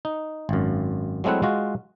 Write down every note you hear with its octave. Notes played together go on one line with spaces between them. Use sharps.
D#4
G#1 F#2
F#3 G#3 A3 C4 E4 F#5
G#3 F4 F#4